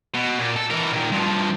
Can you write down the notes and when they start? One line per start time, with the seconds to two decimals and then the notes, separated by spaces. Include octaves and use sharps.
0.15 B2
0.39 A#2
0.56 A4
0.71 E3 A#4
0.92 A#2 D#3
1.12 G2 F3